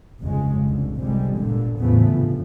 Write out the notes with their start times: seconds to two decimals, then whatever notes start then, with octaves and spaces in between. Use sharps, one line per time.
0.21 F1 C#2 G2 C#3 G#3
0.67 F1 C2 D3
0.98 G1 C3 G3 G#3
1.38 G2 A#2 D3
1.79 A1 E2 C#3 F3 A3 B3
2.09 F1 G2 F3